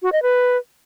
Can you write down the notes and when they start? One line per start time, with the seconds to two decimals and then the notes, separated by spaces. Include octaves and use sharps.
0.02 F#4
0.13 D#5
0.23 B4